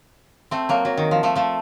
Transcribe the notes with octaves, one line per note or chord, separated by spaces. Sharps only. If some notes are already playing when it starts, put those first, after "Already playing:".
A3 C4
F#3 A#3
F#3
D#3
F3
F3 A3
F3 A3